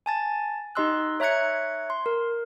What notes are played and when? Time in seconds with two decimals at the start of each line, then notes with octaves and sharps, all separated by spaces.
0.06 G#5 A5 A6
0.75 D#4 G4 D#5 C6 E6 F#6
1.20 C#5 E5 A#5 F#6 G#6 C#7
1.90 C6
2.06 A#4